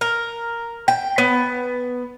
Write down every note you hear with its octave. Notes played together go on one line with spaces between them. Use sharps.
A#4
G5
B3